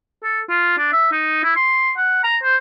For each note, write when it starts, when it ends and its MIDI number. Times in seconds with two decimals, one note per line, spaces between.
0.23 0.41 69
0.49 0.75 65
0.78 0.89 62
0.92 1.11 76
1.12 1.39 63
1.43 1.54 64
1.56 1.92 84
1.97 2.23 78
2.24 2.37 82
2.43 2.56 72